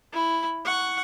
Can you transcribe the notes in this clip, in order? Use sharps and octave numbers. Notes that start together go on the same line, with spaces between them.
E4 B5
F#5 C#6